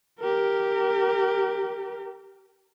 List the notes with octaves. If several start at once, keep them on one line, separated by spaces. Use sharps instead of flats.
G4 A#4